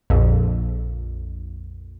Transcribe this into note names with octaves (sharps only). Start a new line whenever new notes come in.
A#1 F2